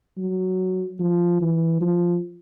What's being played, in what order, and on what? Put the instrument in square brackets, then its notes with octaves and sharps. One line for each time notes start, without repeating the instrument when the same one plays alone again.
[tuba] F#3
F3
E3
F3